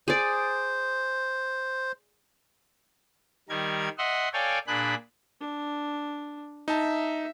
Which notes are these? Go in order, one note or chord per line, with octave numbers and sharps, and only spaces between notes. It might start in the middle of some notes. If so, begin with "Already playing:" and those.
G#4 C5 D5
D#3 G3 A#4 G#6
D#5 E5 F#5 C6
A4 C#5 D5 F5 G5 G#5
A#2 D4 G#4 B5 F#6
D4
D#4 E5 A5